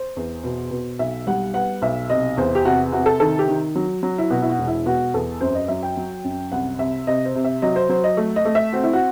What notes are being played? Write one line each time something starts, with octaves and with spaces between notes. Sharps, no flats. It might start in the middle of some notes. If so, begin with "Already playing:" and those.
Already playing: C5
E2
B2
B2
B1 E5
G3 F#5
B3 F#5
B1 E5
C3 D#5
E2 C5
G4
C3 F#4
C3 F#4
A4
D#3 A4
G4
D#3
F#3
F#3
E4
B2 F#4
E4
F#4
E1
E4
B2 F#4
E2 A4
F#2 C5
D#5
F#3 E5
G5
F#3
F#2
C2 F#5
C3 E5
C3 D#5
C5
C3
E5
F#3 D#5
C5
F#3 C5
D#5
A3
D#5
A3
E5
C4 F#4
E4
F#4